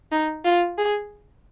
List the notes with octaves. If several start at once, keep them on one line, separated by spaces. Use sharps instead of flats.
D#4
F4
G#4